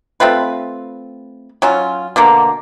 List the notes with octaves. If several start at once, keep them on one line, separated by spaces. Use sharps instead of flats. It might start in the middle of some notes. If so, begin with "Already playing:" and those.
A3 C4 F4 B4
F#3 C#4 F4
B2 D3 A#3